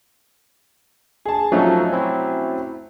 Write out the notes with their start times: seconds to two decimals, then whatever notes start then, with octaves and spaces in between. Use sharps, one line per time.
1.26 G#4 A5
1.52 F3 F#3 A3 C#4 D#4 A4
1.93 C4 E4